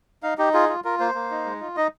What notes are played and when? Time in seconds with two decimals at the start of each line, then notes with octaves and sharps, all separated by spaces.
0.23 D#4 F5
0.38 D#4 G4
0.54 F4 G#4
0.69 F4
0.84 F4 A#4
1.00 A#3 C5
1.15 A#3
1.31 D#4
1.45 G#3
1.61 F4
1.77 D#4 D#5